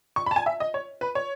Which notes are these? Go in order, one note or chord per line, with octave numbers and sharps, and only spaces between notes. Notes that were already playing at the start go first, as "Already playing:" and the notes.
C#6
B5
A5
G#5
E5
D#5
C#5
B4
C#5